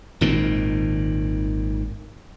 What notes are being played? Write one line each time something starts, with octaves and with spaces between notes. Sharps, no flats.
G#1 A#2 D#3 C4